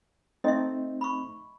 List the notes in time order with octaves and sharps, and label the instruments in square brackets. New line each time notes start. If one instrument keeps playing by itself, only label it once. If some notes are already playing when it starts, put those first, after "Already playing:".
[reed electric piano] A3 C4 D#4 [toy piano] D#5 E5
[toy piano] B5 C#6